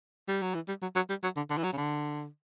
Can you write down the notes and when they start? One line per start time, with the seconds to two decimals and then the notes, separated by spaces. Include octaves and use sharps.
0.28 G3
0.42 F#3
0.55 E3
0.68 G3
0.82 F#3
0.95 F#3
1.09 G3
1.23 F#3
1.36 D3
1.50 D3
1.58 E3
1.64 F#3
1.73 C#3
1.77 D3